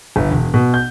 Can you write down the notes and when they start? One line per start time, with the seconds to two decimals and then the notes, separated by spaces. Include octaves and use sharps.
0.16 G1
0.31 E1
0.54 B2
0.74 G6